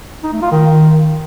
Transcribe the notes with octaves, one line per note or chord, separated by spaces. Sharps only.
D#4
A3
F4
D#3